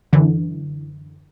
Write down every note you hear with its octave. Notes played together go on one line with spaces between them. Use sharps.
F#2 D3 E3